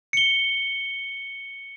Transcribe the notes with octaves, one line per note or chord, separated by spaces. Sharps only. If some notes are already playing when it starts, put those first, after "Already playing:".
C#7 G7